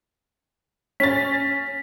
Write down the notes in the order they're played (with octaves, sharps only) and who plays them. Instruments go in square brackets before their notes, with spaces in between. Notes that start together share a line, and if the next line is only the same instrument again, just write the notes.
[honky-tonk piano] C#4 A6 [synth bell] B6